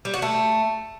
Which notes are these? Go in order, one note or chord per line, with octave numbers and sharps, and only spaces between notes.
G3
F#4
A3